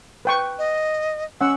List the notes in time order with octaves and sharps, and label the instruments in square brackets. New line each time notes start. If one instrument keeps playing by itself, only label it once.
[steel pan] B4 G5 C#6
[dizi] D#5
[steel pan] C#4 F#5 [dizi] E6